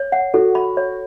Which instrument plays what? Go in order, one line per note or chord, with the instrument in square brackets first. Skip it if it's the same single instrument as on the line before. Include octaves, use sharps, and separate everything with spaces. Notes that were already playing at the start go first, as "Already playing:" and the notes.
Already playing: [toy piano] C#5
F#5
[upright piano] F#4 [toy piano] A4
[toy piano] B5
C#5